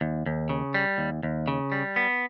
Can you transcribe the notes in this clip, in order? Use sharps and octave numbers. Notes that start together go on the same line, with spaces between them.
D#2
D#2
C#3
G3
D#2
D#2
C#3
G3
B3